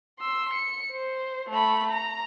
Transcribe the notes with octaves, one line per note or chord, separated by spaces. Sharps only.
C6 E6
C#7
C5
A3 B5
A#5